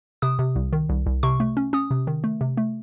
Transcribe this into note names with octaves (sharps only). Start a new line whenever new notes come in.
C3 D#6
C3
C2
D#3
C2
C2
C3 C#6
A3
C#4
C#4 D#6
C3
D#3
A3
C3
A3